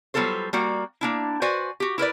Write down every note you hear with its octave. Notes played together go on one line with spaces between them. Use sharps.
F#3 G3 B3 F4 A4 C5
G3 A#3 F#4
A#3 D4 E4
F#4 B4 C5 D5 G#5
F#4 G4
E4 A#4 B4 D5